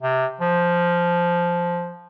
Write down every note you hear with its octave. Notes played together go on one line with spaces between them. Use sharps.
C3
F3